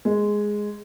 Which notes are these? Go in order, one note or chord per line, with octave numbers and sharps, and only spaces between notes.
G#3